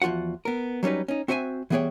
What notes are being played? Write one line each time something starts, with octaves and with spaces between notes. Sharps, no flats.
E2 F3 F4 F#4 F#5
B3 A#4
F#3 G3 C#4 D#4 B4
C#4 D#4
C4 F#4 C5 E5 G5 G#5
E3 G3 B3 G#4 C#5 G5